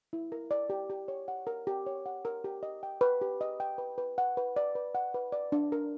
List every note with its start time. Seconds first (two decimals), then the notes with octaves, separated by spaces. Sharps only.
0.13 E4
0.32 A#4
0.51 D5
0.70 G4
0.90 G4
1.08 C#5
1.28 F#5
1.47 A#4
1.67 G4
1.87 C#5
2.06 F#5
2.25 A#4
2.44 G4
2.63 D#5
2.83 G5
3.01 B4
3.21 G4
3.41 D#5
3.60 G5
3.78 B4
3.98 B4
4.18 F#5
4.37 B4
4.56 D5
4.75 B4
4.95 F#5
5.14 B4
5.32 D5
5.52 D4
5.72 A#4